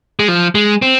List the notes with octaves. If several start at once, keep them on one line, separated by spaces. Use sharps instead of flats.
G#3
F3
G#3
C4